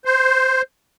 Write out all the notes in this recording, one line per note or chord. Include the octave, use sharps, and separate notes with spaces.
C5